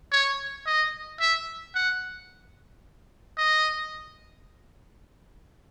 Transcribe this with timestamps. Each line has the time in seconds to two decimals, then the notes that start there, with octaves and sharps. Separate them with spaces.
0.12 C#5
0.66 D#5
1.20 E5
1.75 F#5
3.38 D#5